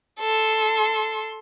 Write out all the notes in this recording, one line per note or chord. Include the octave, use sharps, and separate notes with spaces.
A4 C6